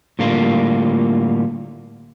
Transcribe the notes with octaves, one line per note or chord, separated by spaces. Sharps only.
A2 D3 G3 A#3 F4